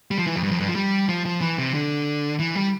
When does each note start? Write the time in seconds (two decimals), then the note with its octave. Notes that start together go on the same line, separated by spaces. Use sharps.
0.11 G3
0.18 F3
0.27 E3
0.36 F2
0.43 G2
0.51 F2
0.60 G2
0.68 F3
0.76 G3
1.09 F3
1.26 F3
1.41 E3
1.58 C3
1.74 D3
2.39 E3
2.57 G3